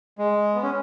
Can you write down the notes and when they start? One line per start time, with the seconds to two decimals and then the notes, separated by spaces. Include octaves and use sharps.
0.18 G#3
0.55 B3
0.63 C#4